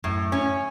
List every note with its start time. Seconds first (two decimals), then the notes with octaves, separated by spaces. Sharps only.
0.04 F#2 A2
0.32 C#4